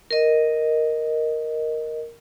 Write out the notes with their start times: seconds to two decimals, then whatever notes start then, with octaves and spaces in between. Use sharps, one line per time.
0.11 A#4 D#5